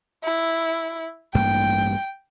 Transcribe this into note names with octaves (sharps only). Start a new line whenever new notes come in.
E4
A1 G2 A#3 G5